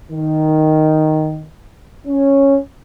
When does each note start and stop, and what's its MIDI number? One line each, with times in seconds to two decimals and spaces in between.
0.12 1.44 51
2.07 2.58 61